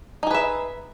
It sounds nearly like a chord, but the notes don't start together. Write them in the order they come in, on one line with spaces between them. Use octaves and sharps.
D#4 G#4 B4 E5